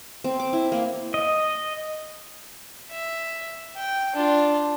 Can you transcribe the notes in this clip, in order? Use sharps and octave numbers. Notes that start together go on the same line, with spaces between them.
C4
D6
E4
A#3
D#5
E5
G5
D4 F4